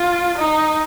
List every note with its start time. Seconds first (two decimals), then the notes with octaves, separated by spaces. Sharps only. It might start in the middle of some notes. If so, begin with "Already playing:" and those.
Already playing: F4
0.38 D#4